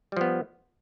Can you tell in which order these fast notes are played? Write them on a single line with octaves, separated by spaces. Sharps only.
G3 F3 B3